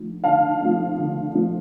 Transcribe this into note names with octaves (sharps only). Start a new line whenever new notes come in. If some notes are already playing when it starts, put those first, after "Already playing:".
Already playing: D3 F3 A3
D3 F5 A5
F3 A3
D3
F3 A3